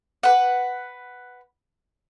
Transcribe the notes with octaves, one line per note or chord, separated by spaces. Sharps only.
B4 F#5